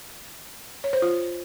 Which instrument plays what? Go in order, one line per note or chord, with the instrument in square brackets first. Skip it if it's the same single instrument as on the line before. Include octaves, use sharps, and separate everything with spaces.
[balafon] C#5
C5
F4